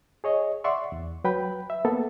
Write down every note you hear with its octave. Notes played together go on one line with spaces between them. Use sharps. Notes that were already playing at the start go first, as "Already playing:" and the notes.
G#4 C#5 D#5
D5 E5 F#5 C6 C#6
E2
F#3 B4 G5 B5
E5
A#3 B3 A4